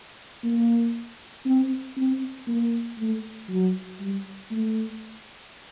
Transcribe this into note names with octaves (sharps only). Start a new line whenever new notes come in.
A#3
C4
C4
A#3
A3
F#3
G3
A3